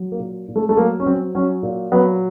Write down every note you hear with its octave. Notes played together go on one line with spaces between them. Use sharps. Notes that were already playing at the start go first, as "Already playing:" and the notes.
Already playing: F#3
A#3
A#2
A#2
A3
A3
F#3 A#3
C#4
F#3 C4
F#3 C#4
A#2
F#3 B3